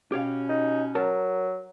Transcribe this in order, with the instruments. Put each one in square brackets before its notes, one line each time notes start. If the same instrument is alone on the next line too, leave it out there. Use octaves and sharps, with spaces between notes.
[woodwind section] B2 C#4 [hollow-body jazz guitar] G4 C#5 F5
[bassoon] D#4
[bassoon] F#3 [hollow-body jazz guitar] A#4 A5